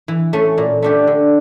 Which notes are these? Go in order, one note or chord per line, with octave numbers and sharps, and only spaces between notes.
E3
A3 C#4
A#2
A3 D4 G4
D3